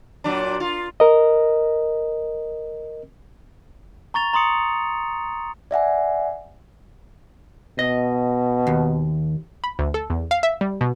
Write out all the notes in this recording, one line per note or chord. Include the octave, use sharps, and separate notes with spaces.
A#2 F#3 D4
F4
A#4 D#5
A#5 C#6 A6 F7
A#5 C6 D#6 C#7
D5 E5 F#5 G#5
B2 D#5
D#2
B5
D2
A4
E2
F5
E5
G3
B2